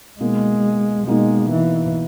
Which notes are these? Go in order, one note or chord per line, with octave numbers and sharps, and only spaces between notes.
B2 G#3 A#3 D#4
B2 G#3 A#3 D#4
E3